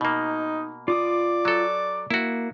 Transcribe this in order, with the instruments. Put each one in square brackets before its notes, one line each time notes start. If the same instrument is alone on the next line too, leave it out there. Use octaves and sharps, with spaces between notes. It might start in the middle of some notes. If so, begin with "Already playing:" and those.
[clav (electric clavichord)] B2 A#3 [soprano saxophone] D#4
[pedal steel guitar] F4 D6 D#6 [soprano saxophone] D5
[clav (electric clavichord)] F#3 A4
[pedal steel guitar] A#3 [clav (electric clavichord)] E4 F#4